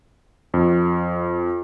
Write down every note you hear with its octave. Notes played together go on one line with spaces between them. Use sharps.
F2